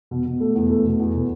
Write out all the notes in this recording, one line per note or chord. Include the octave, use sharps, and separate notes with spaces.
B2
B2
A3
E2
A3
B2
E2
B2